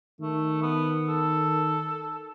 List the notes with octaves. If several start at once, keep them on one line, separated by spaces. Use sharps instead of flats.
D#3 A3
B3
A4